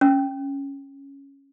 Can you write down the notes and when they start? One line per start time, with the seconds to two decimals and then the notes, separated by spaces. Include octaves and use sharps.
0.01 C#4